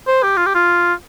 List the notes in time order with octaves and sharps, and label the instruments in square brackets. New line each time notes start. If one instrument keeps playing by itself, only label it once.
[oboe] C5
G4
F4
G4
F4